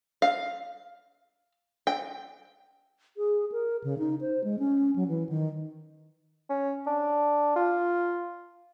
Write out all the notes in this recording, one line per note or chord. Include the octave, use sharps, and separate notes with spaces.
F5
G5
G#4
A#4
C#3
D#4
C5
G#3
C#4
F#3
E3
D#3
C#4
D4
F4